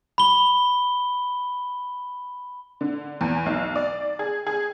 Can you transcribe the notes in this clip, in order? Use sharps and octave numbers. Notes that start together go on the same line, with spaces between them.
B5 G7
D3
E2
B1
D5
G#4
G#4